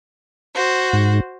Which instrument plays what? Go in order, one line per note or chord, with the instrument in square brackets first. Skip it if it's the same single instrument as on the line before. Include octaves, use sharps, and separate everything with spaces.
[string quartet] F#4 C5
[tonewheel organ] G#2